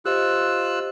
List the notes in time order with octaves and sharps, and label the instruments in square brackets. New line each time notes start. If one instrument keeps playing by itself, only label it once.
[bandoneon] F4 E6 F#6 [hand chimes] G4 C5 D#5